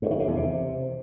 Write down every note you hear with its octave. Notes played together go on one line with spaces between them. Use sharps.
G2
D#3
C3
E2
C3